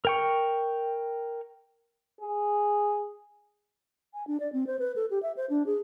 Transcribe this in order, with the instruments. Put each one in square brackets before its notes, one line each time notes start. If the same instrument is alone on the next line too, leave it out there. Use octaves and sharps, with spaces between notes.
[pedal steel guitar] A#4 G5 C#6
[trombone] G#4
[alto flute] G#5
D4
D5
C4
C5
B4
A4
G4
E5
C5
D4
G#4